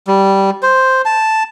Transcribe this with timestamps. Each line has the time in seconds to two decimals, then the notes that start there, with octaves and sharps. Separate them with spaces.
0.07 G3
0.63 C5
1.05 A5